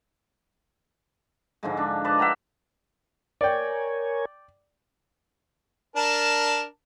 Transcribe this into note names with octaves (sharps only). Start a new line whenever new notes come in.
G#2 D3 F3 G#3
D4
B4 D5 D#5 A5
E5 F#5 G5 A#5
A#4 C#5 D5 G5 G#5
D4 A#4 A5